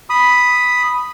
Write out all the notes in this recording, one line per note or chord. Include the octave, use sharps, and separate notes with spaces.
B5 D#6